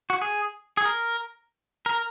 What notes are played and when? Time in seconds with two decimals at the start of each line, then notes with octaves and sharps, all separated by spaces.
0.10 F#4
0.21 G#4
0.77 G#4
0.85 A#4
1.86 A#4